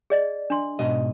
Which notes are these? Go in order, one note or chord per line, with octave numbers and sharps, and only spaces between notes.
G#4 D5 D#5
D4 C6
G#2 B2 D#5